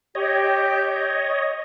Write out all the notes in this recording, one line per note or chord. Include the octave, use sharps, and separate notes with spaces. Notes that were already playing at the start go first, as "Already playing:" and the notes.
G4 C#5 D#5